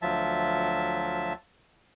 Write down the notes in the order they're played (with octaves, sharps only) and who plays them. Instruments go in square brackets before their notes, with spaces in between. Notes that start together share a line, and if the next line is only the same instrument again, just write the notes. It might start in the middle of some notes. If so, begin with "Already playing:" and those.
[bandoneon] D2 F3 F#3 E5 A5